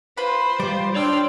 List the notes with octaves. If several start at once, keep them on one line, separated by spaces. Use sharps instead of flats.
F4 B4 C5 B5
G3 F4 D6
D4 C#5 D5 G5 C6 E6 F6